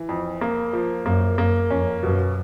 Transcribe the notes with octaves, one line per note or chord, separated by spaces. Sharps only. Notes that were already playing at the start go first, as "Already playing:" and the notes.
Already playing: E3
F2
A#3
F3
F#2 A#3
F#2 A#3
F2 C#4
F#2 B2